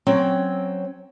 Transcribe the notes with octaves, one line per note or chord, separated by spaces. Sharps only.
F#3 C4 C#4 G5